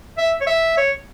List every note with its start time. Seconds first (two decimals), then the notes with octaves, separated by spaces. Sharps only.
0.18 E5
0.41 C#5
0.47 E5
0.77 C#5